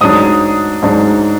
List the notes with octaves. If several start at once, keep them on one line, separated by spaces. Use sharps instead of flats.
G#2 F#3 D4 D#6
G#2 F#3 D4